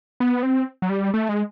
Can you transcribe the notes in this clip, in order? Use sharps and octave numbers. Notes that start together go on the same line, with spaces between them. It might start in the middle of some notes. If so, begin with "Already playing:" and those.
B3
C4
F#3
G3
A3
G#3